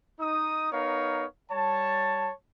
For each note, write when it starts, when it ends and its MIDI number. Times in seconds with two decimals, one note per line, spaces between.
0.20 0.69 63
0.20 0.69 87
0.72 1.26 59
0.72 1.26 63
0.72 1.26 70
0.72 1.26 73
0.72 1.26 77
1.52 2.32 55
1.52 2.32 73
1.52 2.32 81